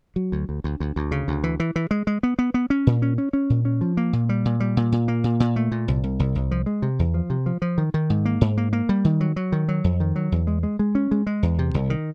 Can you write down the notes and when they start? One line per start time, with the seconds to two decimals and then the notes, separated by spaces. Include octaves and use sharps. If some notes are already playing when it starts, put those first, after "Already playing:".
0.16 F#3
0.32 D2
0.49 D2
0.64 D2
0.80 D2
0.96 D2
1.11 C#3
1.28 D2
1.44 E3
1.60 E3
1.76 E3
1.91 G#3
2.07 G#3
2.23 B3
2.39 B3
2.54 B3
2.70 C#4
2.87 A#2
3.02 C#4
3.18 C#4
3.33 C#4
3.50 A#2
3.65 C#4
3.81 F3
3.97 A#3
4.13 A#2
4.29 G3
4.45 A#2
4.60 G3
4.77 A#2
4.92 A#2
5.08 A#3
5.24 A#2
5.40 A#2
5.56 A3
5.72 A#2
5.88 C2
6.04 C2
6.19 C2
6.35 C2
6.51 F3
6.66 G#3
6.82 C3
6.99 E2
7.14 F3
7.30 C3
7.46 F3
7.62 F3
7.78 D#3
7.94 D#3
8.10 G#2
8.25 A#3
8.41 G#2
8.58 A#3
8.73 A#3
8.89 G3
9.05 D#3
9.21 F#3
9.36 F#3
9.52 D#3
9.68 F#3
9.84 F2
10.00 D#3
10.16 F#3
10.32 E2
10.47 G#3
10.63 G#3
10.79 G#3
10.95 C#4
11.11 G#3
11.27 G#3
11.43 E2
11.59 C3
11.74 C2
11.90 D#3